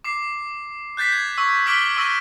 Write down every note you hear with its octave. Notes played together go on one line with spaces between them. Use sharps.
D6 C7
F#6 G6 A6 B6 C7
G#6
C#6 E6
D6 F6 B6 D7 F#7 G7
C#6 E6 A#6 D#7